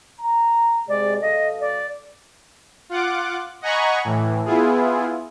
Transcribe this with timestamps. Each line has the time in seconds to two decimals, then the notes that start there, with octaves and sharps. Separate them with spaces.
0.20 A#5
0.89 C3 G#3 D5
1.22 B1 A4 D#5 F5
1.60 D5
2.89 F4 F#5 D6
3.62 D#5 F#5 G#5 A#5 B5 C#6
4.05 A2 E3
4.45 B3 E4 F4 G#4